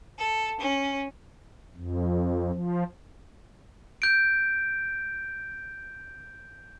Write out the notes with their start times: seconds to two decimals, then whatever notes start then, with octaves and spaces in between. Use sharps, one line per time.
0.17 A4
0.59 C#4
1.76 F2
2.53 F3
4.02 G6 D7